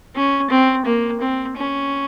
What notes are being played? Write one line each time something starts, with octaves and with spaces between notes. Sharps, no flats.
C#4
C4
A#3
C4
C#4